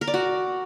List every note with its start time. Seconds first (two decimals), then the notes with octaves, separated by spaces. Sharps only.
0.01 A#4
0.07 D5
0.14 F#4